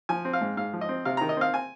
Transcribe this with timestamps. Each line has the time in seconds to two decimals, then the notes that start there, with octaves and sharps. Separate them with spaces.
0.09 F3 G#5
0.25 C4
0.33 F5
0.41 G#2
0.57 G#2 F5
0.73 F3
0.81 D#5
0.89 C4
1.05 C3 F5
1.17 D#3 A#5
1.29 D#5
1.37 C4 F5
1.54 G#5